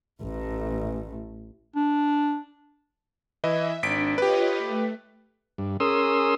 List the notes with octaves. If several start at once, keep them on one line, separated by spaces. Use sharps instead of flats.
A1 A2
D4
E3 E4 D#5 E5
G#1 D4 B6 D7
F4 G4 B4 C#5 D#5
A3
G2
C#4 G#4 A#4 C6 D#6 E6